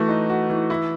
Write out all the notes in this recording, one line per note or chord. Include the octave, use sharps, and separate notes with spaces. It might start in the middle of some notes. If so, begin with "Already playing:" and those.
Already playing: E3 A3 F#4
D#4
F#4
E3
E4